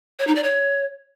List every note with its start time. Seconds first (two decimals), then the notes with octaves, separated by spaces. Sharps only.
0.19 C#5
0.27 D#4
0.35 D5
0.43 C#5